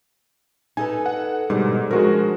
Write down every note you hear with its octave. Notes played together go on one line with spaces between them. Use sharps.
D#4 A4 B4 G#5
F#5
G#2 B2 D3 G3
F3 G#3 D4 F#4 A#4